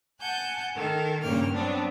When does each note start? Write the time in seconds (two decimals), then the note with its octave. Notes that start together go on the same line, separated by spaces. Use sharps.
0.20 F#5 G#5 A5 F#6 G6
0.76 D#3 A4 A#4
1.22 G2 A#2 C#3 A#3 G5 F6
1.52 F#3 B3 C4 D4